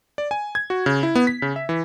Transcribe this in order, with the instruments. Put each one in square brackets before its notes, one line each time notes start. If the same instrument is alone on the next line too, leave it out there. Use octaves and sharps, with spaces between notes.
[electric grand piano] D5
G#5
G#6
F#4
C#3
E4
B3
B6
C#3
E5
E3